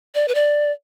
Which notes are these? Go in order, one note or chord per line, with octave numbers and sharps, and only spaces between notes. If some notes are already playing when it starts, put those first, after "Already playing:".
D5
B4
D5